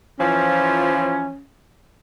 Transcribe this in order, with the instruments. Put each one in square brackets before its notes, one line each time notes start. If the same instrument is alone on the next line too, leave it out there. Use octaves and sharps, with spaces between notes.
[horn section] E3 F3 [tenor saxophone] C#4